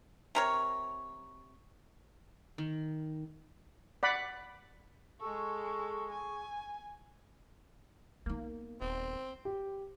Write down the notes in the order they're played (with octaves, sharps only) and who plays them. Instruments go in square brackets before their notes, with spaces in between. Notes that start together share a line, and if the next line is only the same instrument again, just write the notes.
[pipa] C3 A#4 C#5
[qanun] D#3
[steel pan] D5 F#5 B5
[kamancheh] G#3 A4 [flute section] G#4 C#6
[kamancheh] G#5
[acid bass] A#3 [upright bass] B3 D#4
[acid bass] D#1 [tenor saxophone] C4
[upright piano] G4